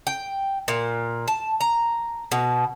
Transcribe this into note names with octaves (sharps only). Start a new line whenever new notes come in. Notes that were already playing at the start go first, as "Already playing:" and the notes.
G5
A#2
A5
A#5
B2